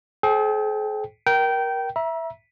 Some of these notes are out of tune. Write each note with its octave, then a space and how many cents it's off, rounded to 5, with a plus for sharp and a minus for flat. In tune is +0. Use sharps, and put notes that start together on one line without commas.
G#4 +45 C5 +20 G5 +0
A#4 +20 G5 -20
E5 +0 A#5 +40